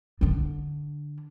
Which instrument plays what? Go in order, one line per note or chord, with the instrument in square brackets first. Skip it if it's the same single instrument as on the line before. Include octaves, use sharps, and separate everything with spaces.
[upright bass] D3 D4